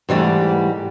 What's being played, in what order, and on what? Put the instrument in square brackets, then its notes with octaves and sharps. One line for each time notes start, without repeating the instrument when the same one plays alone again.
[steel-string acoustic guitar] G#2 E3 G3 A3